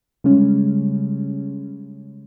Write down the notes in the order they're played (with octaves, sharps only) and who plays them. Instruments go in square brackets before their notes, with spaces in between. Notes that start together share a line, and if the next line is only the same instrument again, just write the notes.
[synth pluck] C#3 G3 G#3 C#4